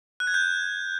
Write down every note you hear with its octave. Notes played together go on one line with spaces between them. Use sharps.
F#6
G#6
G6